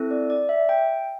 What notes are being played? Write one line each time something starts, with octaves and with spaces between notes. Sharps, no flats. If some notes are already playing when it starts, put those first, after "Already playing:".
Already playing: C4 E4 A4
D5
D5
E5
G5